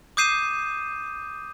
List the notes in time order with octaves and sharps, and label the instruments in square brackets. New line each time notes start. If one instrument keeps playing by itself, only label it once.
[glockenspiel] D6 D#6 G6 C7 D#7 E7